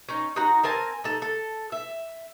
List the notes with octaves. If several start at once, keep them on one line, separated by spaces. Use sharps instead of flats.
C#4 D#4
D#4 F#4 A#5
C4 A#4 G#5 A5
D#4 A4
A4
E5